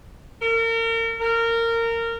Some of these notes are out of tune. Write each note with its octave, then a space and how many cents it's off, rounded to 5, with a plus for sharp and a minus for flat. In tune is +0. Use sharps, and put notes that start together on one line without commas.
A#4 -35
A#4 -20